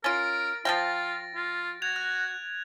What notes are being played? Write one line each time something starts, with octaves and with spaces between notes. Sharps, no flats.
C#4 F4 A#4 A6 D7
F3 F4 F5 G5 A6 A#6
F4
F#4 G#6 F7
F#6